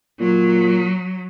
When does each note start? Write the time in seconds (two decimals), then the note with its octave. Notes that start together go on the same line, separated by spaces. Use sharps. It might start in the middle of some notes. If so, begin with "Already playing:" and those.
0.20 A#2 F#3